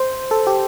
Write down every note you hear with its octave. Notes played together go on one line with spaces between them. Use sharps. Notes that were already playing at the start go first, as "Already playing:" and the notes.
Already playing: C5
A4
G4